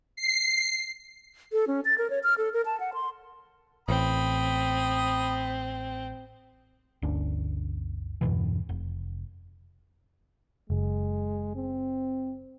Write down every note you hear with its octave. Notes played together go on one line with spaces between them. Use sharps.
C7
A4
C#4
A6
A#4
C#5
F6
A4
A#4
A5
F#5
C6
A1 C4 B5 D#6
G1 D2 C#4 D4
E2 G2 B2 E3
F1
F#1 G#3
C4